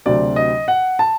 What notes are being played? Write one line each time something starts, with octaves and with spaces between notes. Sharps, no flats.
D2 C3 F#3 C4 D5
D#5
F#5
A5